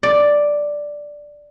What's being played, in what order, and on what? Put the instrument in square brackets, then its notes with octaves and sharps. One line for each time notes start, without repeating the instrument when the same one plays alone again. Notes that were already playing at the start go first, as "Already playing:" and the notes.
[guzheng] D5